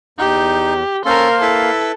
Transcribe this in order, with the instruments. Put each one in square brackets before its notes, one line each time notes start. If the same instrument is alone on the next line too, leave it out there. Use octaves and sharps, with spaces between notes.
[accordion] E2 [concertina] D#4 [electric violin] G4
[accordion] A#3 F5 [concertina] C#4 A4 [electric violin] A#4 C5
[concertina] E4 B4 [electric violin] A4